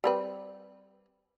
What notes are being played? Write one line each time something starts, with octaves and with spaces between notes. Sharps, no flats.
G3 C4 B4